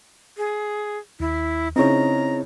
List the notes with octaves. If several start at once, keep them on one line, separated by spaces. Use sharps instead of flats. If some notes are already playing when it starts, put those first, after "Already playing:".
G#4
D#2 E4
C#3 C4 D#4 E4 C#5 A#5